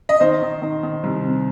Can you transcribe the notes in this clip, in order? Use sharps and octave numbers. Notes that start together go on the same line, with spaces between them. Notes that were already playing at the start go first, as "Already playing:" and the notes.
D#5
D#3 C5
D#3
D#3
D#3
C2
C3